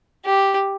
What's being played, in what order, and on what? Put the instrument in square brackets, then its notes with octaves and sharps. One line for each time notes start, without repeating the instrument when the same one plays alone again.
[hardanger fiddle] G4